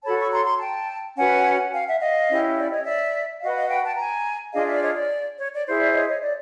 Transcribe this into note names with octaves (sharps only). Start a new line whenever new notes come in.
F#4 A4 C#5 A5 B5
B5 C#6
A#5 C6
A#5 C6
G5 A5
C#4 F#4 B4 F#5 G#5
F5 G5
E5 F#5
D#5 F5
C#4 E4 G4
D5
C#5 D#5
D5 E5
F#4 B4 D#5 F5
D#5 F5
F5 G5
G5 A5
G#5 A#5
D4 F4 G#4 D#5 F5
D5 E5
C#5 D#5
D5
C#5
D5
E4 G#4 C5
D5 E5
C#5 D#5
C#5 D#5
D5